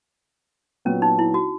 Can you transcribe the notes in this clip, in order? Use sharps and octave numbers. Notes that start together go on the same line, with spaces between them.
A#2 F#3 B3 C#4
D#4
E4
F#4